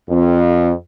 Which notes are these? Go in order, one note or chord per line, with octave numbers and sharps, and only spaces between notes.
F2